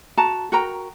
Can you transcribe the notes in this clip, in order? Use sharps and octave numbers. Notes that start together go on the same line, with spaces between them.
F#4 A5 A#5
F#4 A#4 G5 A#5